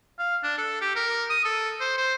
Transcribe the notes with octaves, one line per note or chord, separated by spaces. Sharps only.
F5
D4
A4
G4
A#4
D#6
A4
C5
C5